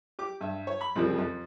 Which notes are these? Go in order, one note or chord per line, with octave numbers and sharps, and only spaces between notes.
G4 D6
G2 E5
C#5
B5
C2 F2 C#3 F3 G3 C4
F2